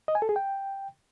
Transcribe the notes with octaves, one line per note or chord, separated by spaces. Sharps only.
D#5
G#5
A4
G#4
G5